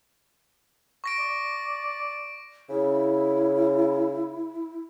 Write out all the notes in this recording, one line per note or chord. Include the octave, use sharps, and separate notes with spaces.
C#6 A#6 D7
D5
C#3 E4